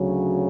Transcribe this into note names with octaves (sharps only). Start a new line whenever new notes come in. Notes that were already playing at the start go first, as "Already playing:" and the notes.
Already playing: D2 C#3 F#3